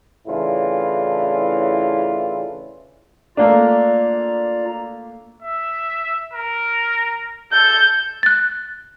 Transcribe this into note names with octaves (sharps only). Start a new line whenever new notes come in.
A2 C#3 E3 D4 E4 F4
A3 A#3 D4 F4 D5 A#5
E5
A#4
A4 G6
F#6 A6